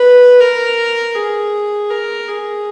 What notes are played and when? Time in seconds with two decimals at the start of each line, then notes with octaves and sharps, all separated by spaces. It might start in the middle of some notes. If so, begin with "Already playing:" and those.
Already playing: B4
0.41 A#4
1.16 G#4
1.91 A#4
2.28 G#4